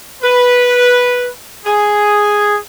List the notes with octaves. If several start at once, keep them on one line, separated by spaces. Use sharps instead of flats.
B4
G#4